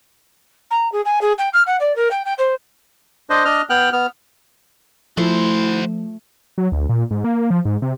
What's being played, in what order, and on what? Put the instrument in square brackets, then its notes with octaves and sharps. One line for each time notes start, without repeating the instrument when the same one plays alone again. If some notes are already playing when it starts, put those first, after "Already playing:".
[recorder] A#5
G#4
G#5
G#4
G5
F6
F#5
D5
A#4
G5
G5
C5
[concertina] D4 C5 D#5
D4 D#5 F6
B3 G5 F6 F#6
B3 F6
[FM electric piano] F3 [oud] A3 [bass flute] E4 [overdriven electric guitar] F#4 C5
[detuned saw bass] F#3
D2
A#2
G#2
A#3
F3
G#2
C3